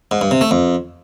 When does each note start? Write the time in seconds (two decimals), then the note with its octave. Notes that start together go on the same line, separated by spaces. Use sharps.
0.11 G#2
0.21 G2
0.31 C3
0.41 A3
0.51 F2